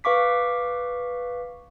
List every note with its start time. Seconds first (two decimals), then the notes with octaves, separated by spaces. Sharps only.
0.04 B4 F5 C#6 D6 B6